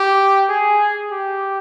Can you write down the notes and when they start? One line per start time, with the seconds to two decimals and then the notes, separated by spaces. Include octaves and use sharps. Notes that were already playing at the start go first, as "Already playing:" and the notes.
Already playing: G4
0.49 G#4
1.11 G4